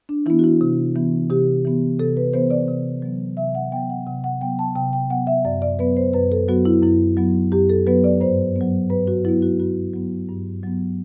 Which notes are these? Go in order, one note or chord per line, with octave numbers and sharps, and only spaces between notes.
D4
E3 B3 E4
F#4
E4
C3
E3 B3
C3 G4
E3 B3
C3 A4
B4
E3 B3 C5
D5
C3
F#3 B3
C3 E5
F#5
F#3 B3 G5
F#5
C3 F#5
F#5
F#3 B3 G5
A5
C3 G5
G5
F#3 B3 F#5
E5
F#2 D5
D5
F#3 B3 B4
C5
F#2 B4
A4
F#3 B3 F#4
E4
F#2 E4
F#3 B3
F#2 G4
A4
F#3 B3 B4
D5
G2 C5
F#3 B3
G2 B4
F#4
F#3 B3 E4
F#4
G2 F#4
F#3 B3
G2
F#3 B3